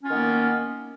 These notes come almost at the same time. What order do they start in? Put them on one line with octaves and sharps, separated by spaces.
C#4 F4 D#3 B3 A#3